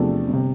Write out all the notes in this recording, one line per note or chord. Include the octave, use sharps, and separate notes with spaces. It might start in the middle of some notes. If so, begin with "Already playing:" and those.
Already playing: E2 C3 F3 A3 D4
G1
C3